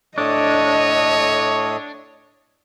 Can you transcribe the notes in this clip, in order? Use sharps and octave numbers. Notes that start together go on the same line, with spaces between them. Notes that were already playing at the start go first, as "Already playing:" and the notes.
A2 D4 A4 C#5 D#5 D#6